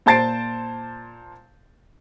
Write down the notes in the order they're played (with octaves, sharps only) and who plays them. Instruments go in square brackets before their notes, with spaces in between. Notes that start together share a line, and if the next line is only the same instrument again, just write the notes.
[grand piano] A#2 C5 A5 A6 C7 D7